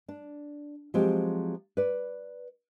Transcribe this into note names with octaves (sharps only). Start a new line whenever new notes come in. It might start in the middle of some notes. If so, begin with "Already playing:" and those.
D4
F3 F#3 G#3 C4 G4
B4 D5